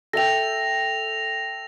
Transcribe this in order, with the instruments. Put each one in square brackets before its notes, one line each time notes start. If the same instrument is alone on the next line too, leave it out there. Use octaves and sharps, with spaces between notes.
[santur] A4 E5 G5 [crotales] A#6 F7